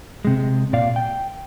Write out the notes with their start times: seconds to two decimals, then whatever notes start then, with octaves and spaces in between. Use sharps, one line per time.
0.25 C3 G#3
0.73 A#2 D5 F5
0.96 G5